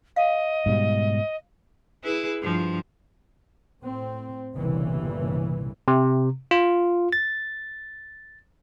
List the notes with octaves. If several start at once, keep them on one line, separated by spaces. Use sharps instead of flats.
D#5 F5
G#2 B2 G3
E4 G#4 B4
G2 F3
A2 C4
G1 C2 A#2 C#3 E3
C3
F4
A6